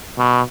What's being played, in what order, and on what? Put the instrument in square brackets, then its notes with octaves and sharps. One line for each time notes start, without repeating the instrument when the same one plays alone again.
[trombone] B2